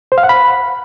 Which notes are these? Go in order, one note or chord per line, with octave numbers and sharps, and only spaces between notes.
C5
F5
F#5
B5